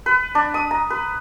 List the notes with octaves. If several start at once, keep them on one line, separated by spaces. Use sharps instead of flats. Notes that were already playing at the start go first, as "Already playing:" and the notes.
B4
D4
D#6
A#5
B4